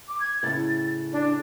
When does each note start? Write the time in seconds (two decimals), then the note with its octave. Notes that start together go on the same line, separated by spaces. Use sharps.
0.08 D6
0.20 G#6
0.43 A2 C#3 A6
1.12 D4